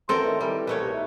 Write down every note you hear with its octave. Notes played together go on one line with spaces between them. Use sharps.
F#2 E3 C4 A4 A#4 C6
D#3 E3 A3
A2 E3 G3
B2 A3 A#3 A#4 B4 C#5
C2
D#4 E4